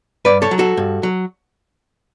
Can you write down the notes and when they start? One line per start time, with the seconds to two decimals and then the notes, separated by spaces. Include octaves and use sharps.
0.25 G2 B4 D5
0.42 A4 C#5
0.51 F#3
0.59 F#4 A4
0.77 G2
1.03 F#3